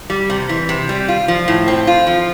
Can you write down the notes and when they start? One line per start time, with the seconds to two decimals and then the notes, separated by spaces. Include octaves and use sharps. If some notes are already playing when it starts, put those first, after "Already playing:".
0.10 G3
0.30 C3
0.49 E3
0.69 C3
0.89 G3
1.08 F4
1.28 F3
1.48 A2
1.68 C4
1.87 F4
2.07 F3